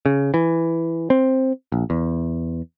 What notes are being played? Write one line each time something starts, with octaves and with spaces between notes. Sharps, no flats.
C#3
E3
C4
A#1
E2